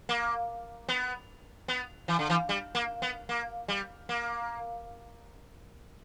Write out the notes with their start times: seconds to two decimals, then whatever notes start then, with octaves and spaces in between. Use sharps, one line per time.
0.09 A#3
0.89 B3
1.68 B3
2.08 E3
2.19 D3
2.30 E3
2.49 G3
2.75 A#3
3.02 B3
3.29 A#3
3.68 G3
4.09 A#3